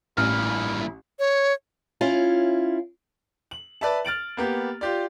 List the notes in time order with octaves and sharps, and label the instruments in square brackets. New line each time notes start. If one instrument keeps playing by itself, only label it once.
[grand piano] A1 [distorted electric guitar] G2 A#2 [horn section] E4 [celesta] F6
[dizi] C#5
[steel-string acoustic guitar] C#4 E4 F4
[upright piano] F#7
B4 D5 E5 A5
F6 A6 D7 F#7
A#3 B3 G4
F4 G4 D5